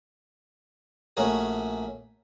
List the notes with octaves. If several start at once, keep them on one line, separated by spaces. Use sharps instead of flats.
A#1 A3 C#4 F#4 G#4 A#4